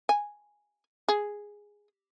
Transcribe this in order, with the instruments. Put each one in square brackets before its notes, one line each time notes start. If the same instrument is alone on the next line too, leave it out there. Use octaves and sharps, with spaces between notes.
[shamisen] G#5
G#4